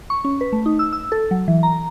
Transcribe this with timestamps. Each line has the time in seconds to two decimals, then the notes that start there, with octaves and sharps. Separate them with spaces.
0.10 C#6
0.25 C#4
0.41 B4
0.53 A3
0.66 D#4
0.79 E6
0.93 E6
1.12 A4
1.31 F#3
1.48 E3
1.63 A#5